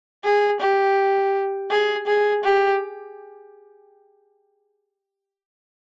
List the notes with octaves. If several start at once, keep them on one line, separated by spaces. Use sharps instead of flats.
G#4
G4
G#4
G#4
G4